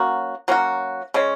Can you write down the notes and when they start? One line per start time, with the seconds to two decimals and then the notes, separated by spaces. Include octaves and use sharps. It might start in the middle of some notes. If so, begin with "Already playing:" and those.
Already playing: F#3 A#3 C#4 F#4
0.48 F#3 A#3 C#4 F#4
1.14 C#3 G#3 C#4